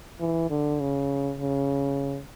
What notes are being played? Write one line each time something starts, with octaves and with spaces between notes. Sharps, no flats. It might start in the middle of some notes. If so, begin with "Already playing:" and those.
E3
D3
C#3
C#3